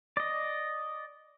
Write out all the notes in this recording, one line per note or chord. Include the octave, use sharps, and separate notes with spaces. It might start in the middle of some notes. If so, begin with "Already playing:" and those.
D5 D#5